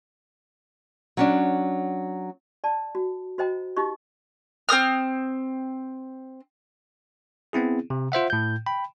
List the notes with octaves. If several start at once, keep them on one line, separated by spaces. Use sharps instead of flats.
F#3 C#4 D4
D5 A5
F#4
F#4 C5 D#5 G5 A#5
D#4 F4 G4 D#5 C#6
C4 C5 D#6 F6
B3 C4 E4 G#4
C3
F4 C5 E5 F#5
A2 G6
G5 B5